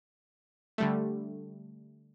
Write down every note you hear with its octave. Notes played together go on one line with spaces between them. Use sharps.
D3 G3 A3